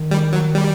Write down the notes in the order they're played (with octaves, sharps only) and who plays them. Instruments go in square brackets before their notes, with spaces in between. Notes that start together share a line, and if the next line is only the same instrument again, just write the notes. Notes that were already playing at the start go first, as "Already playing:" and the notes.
Already playing: [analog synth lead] D#3
[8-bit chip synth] G3
F#3
G3